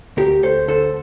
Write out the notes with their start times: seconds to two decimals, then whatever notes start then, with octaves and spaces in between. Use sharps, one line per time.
0.17 D2 G4 A#4
0.43 D2 A4 C5
0.68 D3 A4 C5